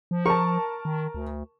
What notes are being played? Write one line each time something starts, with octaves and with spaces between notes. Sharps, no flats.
F3
A#4 A5 C#6
D#3
D2